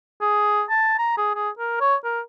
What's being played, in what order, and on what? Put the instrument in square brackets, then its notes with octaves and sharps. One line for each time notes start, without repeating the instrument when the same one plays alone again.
[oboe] G#4
A5
A#5
G#4
G#4
A#4
C#5
A#4